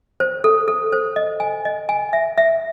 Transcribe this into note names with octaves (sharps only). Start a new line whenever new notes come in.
C5
A4
A4
C5
D#5
G#5
D#5
G#5
E5
E5